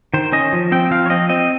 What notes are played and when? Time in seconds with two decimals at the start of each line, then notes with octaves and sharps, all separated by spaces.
0.14 D#3 C5
0.33 C#4 D#5
0.53 F3
0.72 C4 G5
0.91 F3 F5
1.06 C#5
1.10 C4 D#5
1.29 C4 D#5